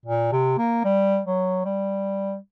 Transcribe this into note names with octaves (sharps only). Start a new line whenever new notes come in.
A#2
C3
A#3
G3
F#3
G3